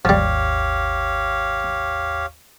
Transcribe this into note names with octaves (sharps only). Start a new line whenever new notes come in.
G#1 D#2 F3 G3 G4 C#5 F5